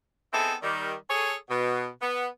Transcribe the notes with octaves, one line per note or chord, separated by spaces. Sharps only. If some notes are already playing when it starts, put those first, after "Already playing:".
B3 C4 D#4 E4 G#4 A4
D#3 G3
G#4 A4 C#5
B2
B3